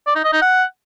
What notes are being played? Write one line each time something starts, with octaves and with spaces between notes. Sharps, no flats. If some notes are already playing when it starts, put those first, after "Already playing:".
D5
D#4
D#5
D#4
F#5